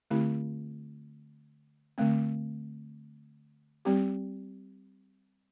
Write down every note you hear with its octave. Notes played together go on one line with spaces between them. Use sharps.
D3 A3 C4 E4 G4
D3 A3 C4
G3 C4 G4